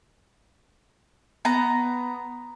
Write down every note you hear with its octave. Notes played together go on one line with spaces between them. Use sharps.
B3 A#5